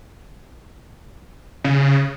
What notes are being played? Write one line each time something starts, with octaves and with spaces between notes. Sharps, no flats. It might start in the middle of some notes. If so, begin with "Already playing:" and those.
C#3